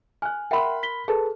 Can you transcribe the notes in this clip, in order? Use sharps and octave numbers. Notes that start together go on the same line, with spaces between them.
G#5 F6 F#6
A#4 E5 F#5 G5 B5 C6
B6 G7
G#4 A4 B4 A5